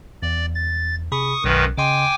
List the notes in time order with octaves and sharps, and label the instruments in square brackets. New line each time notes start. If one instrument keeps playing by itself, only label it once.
[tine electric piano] E2 [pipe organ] D5
[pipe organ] A6
[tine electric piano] C3 G#4 B5 [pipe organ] C#6 D#6
[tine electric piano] B1 [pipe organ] F#2 D#3 B4
[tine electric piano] C#3 D#5 C6 [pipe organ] G5 G#5 D6